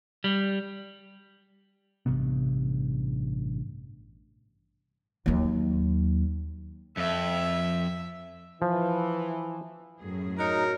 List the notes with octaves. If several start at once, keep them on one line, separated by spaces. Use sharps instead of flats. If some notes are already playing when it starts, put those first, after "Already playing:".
G3
A1 G2 C3 B3
D#2 F#3
F2 E5
E3 F3
F#2 A2 G#4
D#4 F#4 A#4 C#5